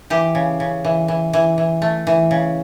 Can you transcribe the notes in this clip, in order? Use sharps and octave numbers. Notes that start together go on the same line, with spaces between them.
E3 G4
C#3
C#3
E3
E3
E3
E3
A3
E3
C#3